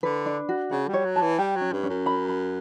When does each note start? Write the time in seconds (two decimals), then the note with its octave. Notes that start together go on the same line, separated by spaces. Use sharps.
0.03 D3 B4
0.26 D4
0.49 F#4
0.71 C#3 F#5
0.88 G3
0.93 C#5
1.05 F#3
1.16 A5
1.21 E3
1.38 G3 G5
1.56 F#3
1.61 C#4
1.72 G2
1.83 C#4
1.89 F#2
2.06 B5
2.29 B5